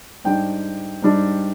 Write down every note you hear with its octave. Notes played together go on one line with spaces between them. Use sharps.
G#2 G3 D4 G5
G#2 G3 D4